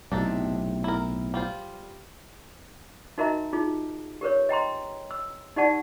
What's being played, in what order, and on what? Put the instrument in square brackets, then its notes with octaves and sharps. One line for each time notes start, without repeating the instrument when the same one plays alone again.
[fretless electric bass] B1 A2 C3 [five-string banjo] D4 D#4 A4
[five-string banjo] E4 A#4
G3 F4 C5
[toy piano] D#4 F#4 A#4 D#5 E5 A#5
D#4 F4 G#4
G4 A#4 B4 C#5
D#5 G5 A#5 C6
E6
D#4 G4 D5 F#5 A5